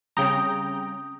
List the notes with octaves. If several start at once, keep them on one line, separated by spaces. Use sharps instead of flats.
C#3 G3 C4 C#4 G5 A#5 D#6